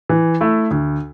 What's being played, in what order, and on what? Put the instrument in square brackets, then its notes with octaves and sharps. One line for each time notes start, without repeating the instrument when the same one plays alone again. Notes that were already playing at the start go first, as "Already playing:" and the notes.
[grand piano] E3
A3 E4
D2